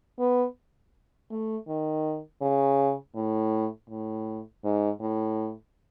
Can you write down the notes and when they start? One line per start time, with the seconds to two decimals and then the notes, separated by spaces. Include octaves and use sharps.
0.19 B3
1.30 A3
1.68 D#3
2.41 C#3
3.15 A2
3.90 A2
4.64 G#2
5.01 A2